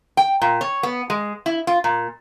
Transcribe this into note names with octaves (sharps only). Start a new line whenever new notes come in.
G5
A#2
C#5
B3
G#3
E4
F4
A#2